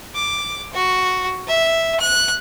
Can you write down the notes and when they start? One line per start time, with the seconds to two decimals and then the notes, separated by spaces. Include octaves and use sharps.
0.15 D6
0.73 F#4
1.47 E5
2.00 F#6